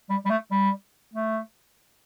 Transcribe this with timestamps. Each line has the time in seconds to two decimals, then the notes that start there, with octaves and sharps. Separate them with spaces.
0.10 G3
0.25 G3
0.30 A3
0.51 G3
1.14 A3